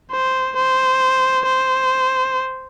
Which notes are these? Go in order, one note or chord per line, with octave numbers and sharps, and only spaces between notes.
C5
C5
C5